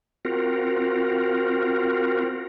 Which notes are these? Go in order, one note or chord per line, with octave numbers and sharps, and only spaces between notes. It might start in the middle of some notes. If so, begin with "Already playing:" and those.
C4 F4 F#4 A#4